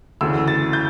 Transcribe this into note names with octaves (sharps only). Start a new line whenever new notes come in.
D2 C#3 E3 E6
A6
G6